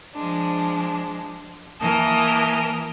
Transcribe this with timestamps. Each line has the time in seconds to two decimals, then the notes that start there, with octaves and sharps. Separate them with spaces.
0.14 F3 G#3 D4
1.80 E3 A#3 A#4 D#5 G#5 A5